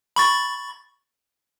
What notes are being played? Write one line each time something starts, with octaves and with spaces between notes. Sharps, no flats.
B5 C#6 A6